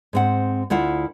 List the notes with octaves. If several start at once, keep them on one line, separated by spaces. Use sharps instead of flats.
G#2 C4 F#5
D2 E4 F4 F#5